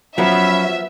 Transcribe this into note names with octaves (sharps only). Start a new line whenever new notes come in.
F3 F#3 B3 C#4 E5 B5